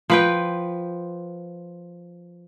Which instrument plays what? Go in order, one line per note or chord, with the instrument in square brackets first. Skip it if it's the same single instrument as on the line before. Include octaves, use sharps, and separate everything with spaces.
[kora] F3 B4 G5